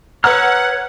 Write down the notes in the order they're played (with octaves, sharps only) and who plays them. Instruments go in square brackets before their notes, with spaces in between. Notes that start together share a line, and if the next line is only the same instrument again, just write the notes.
[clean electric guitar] B4 A#5 [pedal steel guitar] C#5 E6 F6 [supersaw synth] F#5